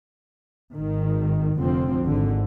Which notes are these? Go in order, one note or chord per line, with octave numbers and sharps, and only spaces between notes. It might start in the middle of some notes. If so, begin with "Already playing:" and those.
G#1 D#3
F1 F2 D3 F3 C4
G#1 G#2 D3